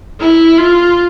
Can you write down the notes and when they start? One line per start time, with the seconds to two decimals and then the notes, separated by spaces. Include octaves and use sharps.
0.21 E4
0.58 F4